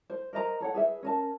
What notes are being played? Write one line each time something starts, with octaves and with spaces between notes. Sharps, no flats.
C5
A#4 C5 D#5 A#5
A4 C#5 F#5
G#4 B4 E5
C#4 A#4 A5